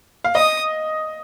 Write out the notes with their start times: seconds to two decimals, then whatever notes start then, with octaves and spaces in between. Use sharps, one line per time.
0.24 F5
0.35 D#5 D#6